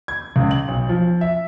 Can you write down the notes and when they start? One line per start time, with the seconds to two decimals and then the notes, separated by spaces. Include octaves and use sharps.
0.08 G#6
0.36 C#2
0.51 F#7
0.68 B1
0.89 F3
1.21 E5